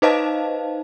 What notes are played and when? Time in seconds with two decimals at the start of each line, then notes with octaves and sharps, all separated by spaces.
0.02 D#4 B4 C5 D#5 F5 A5